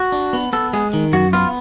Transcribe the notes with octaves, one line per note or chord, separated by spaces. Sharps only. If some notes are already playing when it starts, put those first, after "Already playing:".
Already playing: F#4
D4
B3
B3 A4
G#3 G#4
D#3
F#2 F#4
B3 F4